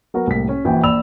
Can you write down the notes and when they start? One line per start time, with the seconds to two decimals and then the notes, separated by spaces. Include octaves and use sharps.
0.14 F#3 B3 F#4 A#4
0.27 C2 A2 A#3 B6
0.49 C#4
0.65 A#1 E3 F#4 G5 G#5
0.83 A#1 D5 B5 E6 F7